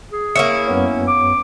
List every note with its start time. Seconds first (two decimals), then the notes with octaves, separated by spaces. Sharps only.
0.12 G#4
0.36 A#3 C#4 E4 C#7
0.68 F#2 B3 C#5
1.08 D6